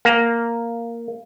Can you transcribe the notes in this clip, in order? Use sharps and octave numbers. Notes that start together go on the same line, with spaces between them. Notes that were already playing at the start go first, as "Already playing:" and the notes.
A#3